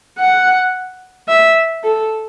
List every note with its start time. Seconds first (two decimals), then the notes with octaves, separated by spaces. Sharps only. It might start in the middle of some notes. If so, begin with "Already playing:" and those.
0.19 F#5
1.28 E5
1.84 A4